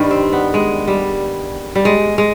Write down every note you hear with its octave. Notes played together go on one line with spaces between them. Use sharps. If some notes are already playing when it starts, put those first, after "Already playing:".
Already playing: G2 D#3 G3
C4
B3
G#3
G3
G3
G#3
G#3